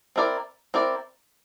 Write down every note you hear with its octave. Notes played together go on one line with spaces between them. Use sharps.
C4 E4 A#4 D5
C4 E4 A#4 D5